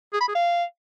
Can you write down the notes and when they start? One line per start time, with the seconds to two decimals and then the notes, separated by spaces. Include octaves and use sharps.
0.13 G#4
0.20 B5
0.28 G#4
0.35 F5